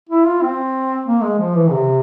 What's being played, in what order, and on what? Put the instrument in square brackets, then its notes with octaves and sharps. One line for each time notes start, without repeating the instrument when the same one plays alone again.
[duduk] E4
F4
C4
A#3
G#3
F3
E3
C3